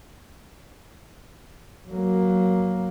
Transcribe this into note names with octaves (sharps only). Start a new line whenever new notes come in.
F#3 A#3